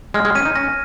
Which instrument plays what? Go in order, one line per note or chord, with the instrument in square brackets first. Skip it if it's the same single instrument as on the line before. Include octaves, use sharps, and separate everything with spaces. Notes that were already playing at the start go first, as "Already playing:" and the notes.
[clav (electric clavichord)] G#3 [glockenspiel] F6
[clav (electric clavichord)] G#3
[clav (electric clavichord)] C#4 [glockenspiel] D#7
[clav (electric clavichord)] D#4
[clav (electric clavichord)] C#4 [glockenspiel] A#6